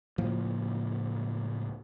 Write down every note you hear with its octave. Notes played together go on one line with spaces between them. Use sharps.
C#2 A2 F3 A#3